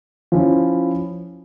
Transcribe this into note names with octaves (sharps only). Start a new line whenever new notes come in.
F3 C#4 E4